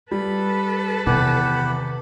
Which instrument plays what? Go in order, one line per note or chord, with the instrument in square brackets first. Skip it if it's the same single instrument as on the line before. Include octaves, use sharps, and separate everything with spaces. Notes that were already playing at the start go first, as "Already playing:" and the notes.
[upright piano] G3 [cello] A4 B4 [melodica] B5
[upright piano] E2 [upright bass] C3 D#3 [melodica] G4 F#5 B5